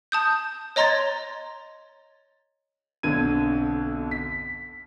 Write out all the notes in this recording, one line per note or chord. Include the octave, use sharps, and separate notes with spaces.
A5 D#6 G6
C#5 D#5 A#5 C6 G#6 A6
B1 D3 C4 G#6 D#7
B6